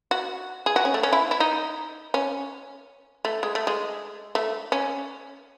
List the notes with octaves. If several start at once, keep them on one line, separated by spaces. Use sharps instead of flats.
F#4
G#4
F#4
C#4
A3
C#4
E4
E4
D#4
C#4
A3
G#3
A3
G#3
A3
C#4